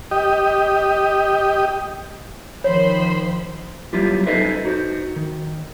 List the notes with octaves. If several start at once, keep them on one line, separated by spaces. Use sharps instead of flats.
G4 D#5
D#3 F3 C5 C#5 B5
F#3 G3 E4 F4 G4
D#4 A4 B4 C5 D#5 E5
D#4 F#4 C5
D#3